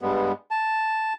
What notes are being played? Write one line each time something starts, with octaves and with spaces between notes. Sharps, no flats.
G2 G3 G#3 B3
A5